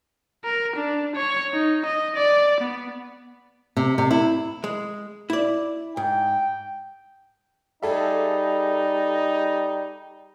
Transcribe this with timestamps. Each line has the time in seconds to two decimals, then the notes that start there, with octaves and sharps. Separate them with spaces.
0.44 A#4
0.76 D4
1.16 C#5
1.53 D#4
1.86 D#5
2.16 D5
2.60 B3
3.77 C3
3.98 C3
4.11 E4
4.64 G#3
5.30 E4 D5
5.97 G#2 G5
7.83 G3 D#4 G#4 A4 E5